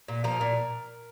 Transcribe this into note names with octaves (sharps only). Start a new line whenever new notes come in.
A#2
F3 A#4
A#2